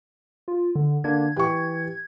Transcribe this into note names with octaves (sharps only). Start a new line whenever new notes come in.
F4
D3
D3 A#3 D4 G#6
E3 G4 C#6